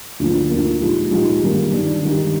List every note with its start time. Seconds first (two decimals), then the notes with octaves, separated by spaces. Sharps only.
0.19 D2 D3 F3 A#3
0.50 D2 D3 F3 A#3
0.81 A#2 F3 G#3 D#4 G4
1.11 A#2 F3 G#3 D#4 G4
1.42 G2 D#3 G3 A#3 D4
1.71 G2 D#3 G3 A#3 D4
2.02 G2 D#3 G#3 D#4 G4